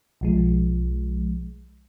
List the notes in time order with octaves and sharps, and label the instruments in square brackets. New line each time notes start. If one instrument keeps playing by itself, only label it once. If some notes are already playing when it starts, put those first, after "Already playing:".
[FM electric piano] B1 F3 G#3